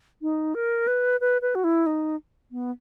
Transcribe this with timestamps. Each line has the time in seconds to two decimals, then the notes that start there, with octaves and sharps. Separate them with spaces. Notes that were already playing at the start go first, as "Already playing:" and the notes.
0.22 D#4
0.55 A#4
0.87 B4
1.21 B4
1.42 B4
1.55 F#4
1.64 E4
1.86 D#4
2.51 B3